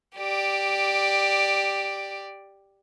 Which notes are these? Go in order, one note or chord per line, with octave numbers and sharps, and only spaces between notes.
G4 D5